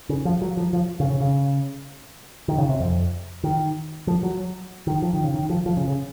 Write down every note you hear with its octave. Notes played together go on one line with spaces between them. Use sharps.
C#3
F3
F#3
F3
F3
C#3
C#3
C#3
D#3
C#3
C3
F2
D#3
F3
F#3
D#3
F3
D#3
C#3
D#3
F3
F3
C#3
C#3